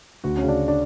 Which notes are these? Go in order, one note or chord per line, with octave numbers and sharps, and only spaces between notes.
D2 F#4
C#4
C#3
D4
D4